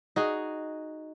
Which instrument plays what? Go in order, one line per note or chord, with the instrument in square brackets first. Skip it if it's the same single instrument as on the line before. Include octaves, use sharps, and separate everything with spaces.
[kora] D#4 F#4 G#4